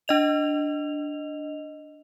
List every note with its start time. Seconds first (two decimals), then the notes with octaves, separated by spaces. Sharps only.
0.08 D4 D#5 F7